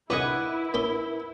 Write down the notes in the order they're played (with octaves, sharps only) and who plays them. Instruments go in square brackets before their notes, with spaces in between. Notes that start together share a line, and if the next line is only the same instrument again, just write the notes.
[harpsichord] C2 D3 D#5 [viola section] E4 [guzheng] B4 F#5 G#5 [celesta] D6
[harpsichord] B3 C#4 D4 [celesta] A#4 G7